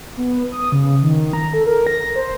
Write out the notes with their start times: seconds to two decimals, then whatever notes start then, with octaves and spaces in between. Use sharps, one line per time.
0.17 B3
0.52 D#6
0.72 C#3
1.02 D#3
1.33 A#5
1.54 A4
1.66 A#4
1.87 A#6
2.16 C5